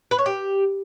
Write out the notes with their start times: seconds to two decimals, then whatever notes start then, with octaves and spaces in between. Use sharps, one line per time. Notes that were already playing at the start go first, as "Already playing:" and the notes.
0.11 B4
0.19 C#5
0.26 G4